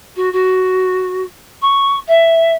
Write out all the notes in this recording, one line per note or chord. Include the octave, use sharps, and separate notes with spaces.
F#4
F#4
C#6
E5